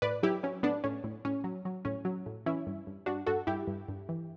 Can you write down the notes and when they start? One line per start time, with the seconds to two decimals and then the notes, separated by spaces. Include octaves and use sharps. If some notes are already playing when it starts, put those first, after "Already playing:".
0.02 A2 B4 D5
0.23 F#3 E4 G4
0.43 F#3 C#4
0.63 A2 B3 D4
0.84 A2 C#4
1.04 A2
1.25 A2 C#4
1.44 F#3
1.65 F#3
1.85 A2 C#4
2.05 F#3
2.26 A2
2.46 E3 C#4 E4
2.67 G2
2.87 G2
3.06 G2 D4 F#4
3.26 G2 F#4 A4
3.47 G2 E4 G4
3.67 G2
3.89 G2
4.09 E3